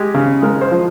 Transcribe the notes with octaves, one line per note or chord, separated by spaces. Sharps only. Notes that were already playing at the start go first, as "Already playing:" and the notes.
Already playing: G#3 G4
C#3
G#3 A#4
C5
F3